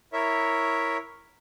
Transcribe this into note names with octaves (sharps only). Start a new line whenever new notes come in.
E4 A#4 C#5 E5